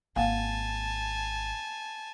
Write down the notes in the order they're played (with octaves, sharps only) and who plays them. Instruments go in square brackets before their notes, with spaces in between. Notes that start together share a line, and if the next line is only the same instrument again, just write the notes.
[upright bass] G#1 [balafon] A#3 F5 F#5 [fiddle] G#5 A5